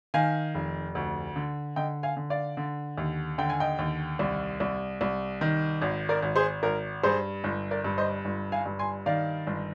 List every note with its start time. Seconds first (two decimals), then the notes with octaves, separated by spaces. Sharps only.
0.14 D#3 F5 G#5
0.55 F1
0.95 D2
1.36 D3
1.76 D3 D#5 G5
2.03 F5 G#5
2.16 D3
2.30 D5 F5
2.57 D3
2.98 D#2
3.38 D3 G5
3.50 G#5
3.60 D#5 G5
3.79 D#2
4.19 C2
4.60 C2
5.01 C2
5.41 D#3
5.82 G#1
6.09 A#4 D5
6.22 G#1
6.36 G#4 C5
6.63 G#1 A#4
7.03 G2 G#4 C5
7.44 G1
7.71 A#4 D5
7.84 G2
7.98 C5 D#5
8.25 G1
8.52 F5 G#5
8.66 G2
8.79 G#5 C6
9.06 D#3 D5 F5
9.47 G1